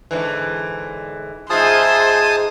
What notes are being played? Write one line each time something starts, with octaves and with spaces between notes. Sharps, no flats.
G#2 D3 E3
G#2 F4 G#4 C5 E5 G#5 A5 D#6